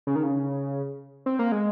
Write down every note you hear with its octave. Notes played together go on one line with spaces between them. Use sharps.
C#3
D#3
C#3
C4
A#3
G#3